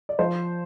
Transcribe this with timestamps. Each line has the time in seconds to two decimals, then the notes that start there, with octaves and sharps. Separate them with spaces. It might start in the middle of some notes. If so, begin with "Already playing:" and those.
0.09 D5
0.19 F3 C5